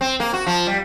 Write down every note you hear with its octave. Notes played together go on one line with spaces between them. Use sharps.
C4
A#3
F#4
F3
G3